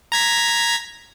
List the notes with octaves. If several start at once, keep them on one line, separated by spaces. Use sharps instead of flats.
A#5 G#6 B6